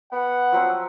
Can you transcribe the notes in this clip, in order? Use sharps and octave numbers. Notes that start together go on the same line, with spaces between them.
B3 F#5
F3 F#3 C4